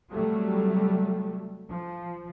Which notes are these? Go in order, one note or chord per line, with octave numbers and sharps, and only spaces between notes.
C3 F#3 G3 A3
F3